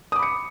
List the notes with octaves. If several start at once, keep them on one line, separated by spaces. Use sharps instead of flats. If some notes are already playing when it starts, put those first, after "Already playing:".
B5 D6 D#6 C#7